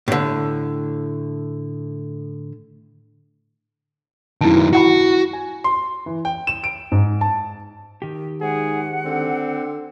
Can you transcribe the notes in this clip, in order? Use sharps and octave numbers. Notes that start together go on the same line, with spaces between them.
A2 D3
F#2 D#3 E4 A5
E4 F#4 F#5 B5
G#5
C6
E3
G5
E7
D7
G#2
A5
D#3 G4
G#2 G#4 F#5
D3 C4